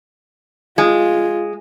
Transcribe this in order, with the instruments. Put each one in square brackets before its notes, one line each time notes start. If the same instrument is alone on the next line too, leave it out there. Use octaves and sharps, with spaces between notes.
[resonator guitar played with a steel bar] G#3 [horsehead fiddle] F4